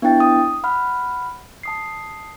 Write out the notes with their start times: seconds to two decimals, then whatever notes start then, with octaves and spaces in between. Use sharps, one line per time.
0.02 B3 D4 E4 G5 A6
0.20 D#6
0.64 F#5 B5 F6
1.63 A5 D#6 C7